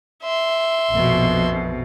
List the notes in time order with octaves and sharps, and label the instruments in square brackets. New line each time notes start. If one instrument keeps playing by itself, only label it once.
[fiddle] E5 C6
[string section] A#1 F2 B2